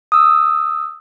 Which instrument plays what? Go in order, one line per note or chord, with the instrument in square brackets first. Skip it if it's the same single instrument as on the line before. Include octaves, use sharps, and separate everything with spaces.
[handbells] D#6 E6